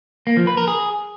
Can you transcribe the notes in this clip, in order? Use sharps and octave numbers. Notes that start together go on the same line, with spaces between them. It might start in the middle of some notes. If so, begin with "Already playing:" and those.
A#3
F3
B4
A#4
G#4